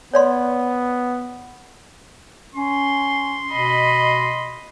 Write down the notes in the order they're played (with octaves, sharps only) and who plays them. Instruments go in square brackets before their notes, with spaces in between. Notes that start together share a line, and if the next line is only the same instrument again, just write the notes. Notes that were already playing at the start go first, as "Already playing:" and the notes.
[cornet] B3 [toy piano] C#5 D5 C6
[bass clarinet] C#4 [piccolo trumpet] C6
[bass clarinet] B2 [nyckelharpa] D#5 B5